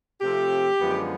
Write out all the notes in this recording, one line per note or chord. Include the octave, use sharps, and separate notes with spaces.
C3 F3 A3 C4 G4
F#2 D3 F3 G#3 B3